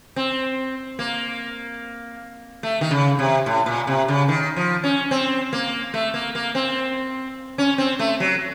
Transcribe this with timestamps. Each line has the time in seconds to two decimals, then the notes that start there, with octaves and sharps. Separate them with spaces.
0.16 C4
0.99 A#3
2.63 A3
2.81 D#3
2.91 C#3
3.19 C3
3.46 A2
3.66 A#2
3.87 C3
4.08 C#3
4.28 D#3
4.56 F3
4.84 C#4
5.11 C4
5.53 A#3
5.94 A3
6.14 A#3
6.35 A#3
6.55 C4
7.58 C#4
7.78 C4
7.99 A3
8.20 F#3